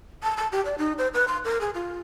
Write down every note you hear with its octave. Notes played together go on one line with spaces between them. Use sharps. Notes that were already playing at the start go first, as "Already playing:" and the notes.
A5
A5
G4
D5
D#4
C5
B4
C6
A#4
G#4
F4